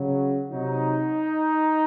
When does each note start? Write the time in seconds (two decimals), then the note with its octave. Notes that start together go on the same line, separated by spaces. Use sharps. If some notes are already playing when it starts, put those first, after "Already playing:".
Already playing: C#3 F#3
0.50 C3 F#3 D#4